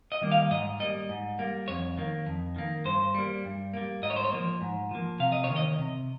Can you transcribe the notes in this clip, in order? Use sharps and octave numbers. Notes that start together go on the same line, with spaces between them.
D#5
D#3 G3 A#3
F5
G#2 D#5
G3 A#3 D#5
G#2
G3 A#3
F2 C#5
D#3 A#3
F2
D#3 A#3
G2 C5
G3 A#3
G2
G3 A#3
G#2 D#5
C#5
C5
C#5
F3 A#3
G#2
F3 A#3
C3 F5
D#5
C#5
D#3 A#3
D#5
C3